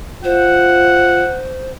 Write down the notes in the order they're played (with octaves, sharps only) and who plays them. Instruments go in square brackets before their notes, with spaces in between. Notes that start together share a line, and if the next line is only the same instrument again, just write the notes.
[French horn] F4 [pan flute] C5 [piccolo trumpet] F#5